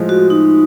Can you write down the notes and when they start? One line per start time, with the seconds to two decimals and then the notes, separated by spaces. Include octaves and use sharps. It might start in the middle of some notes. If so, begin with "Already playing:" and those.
Already playing: A2 F3 G#3
0.09 F#4
0.30 D#4